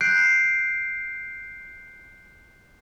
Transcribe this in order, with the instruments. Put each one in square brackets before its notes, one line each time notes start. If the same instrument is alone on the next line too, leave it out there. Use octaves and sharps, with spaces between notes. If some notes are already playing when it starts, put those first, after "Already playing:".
[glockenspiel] F#6 G6 C7 D7